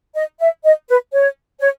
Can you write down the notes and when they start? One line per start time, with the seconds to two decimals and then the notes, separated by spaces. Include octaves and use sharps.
0.15 D#5
0.40 E5
0.65 D#5
0.88 B4
1.13 C#5
1.61 C#5